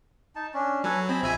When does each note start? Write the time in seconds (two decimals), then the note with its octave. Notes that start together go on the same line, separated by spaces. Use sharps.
0.35 D#4 A5
0.54 C#4 D4
0.84 F#3 A4 B4 G#5
1.09 C4 G#4 D#5 B5
1.22 A#1 E5 G#5